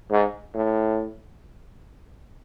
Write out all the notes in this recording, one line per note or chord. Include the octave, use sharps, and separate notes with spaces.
G#2
A2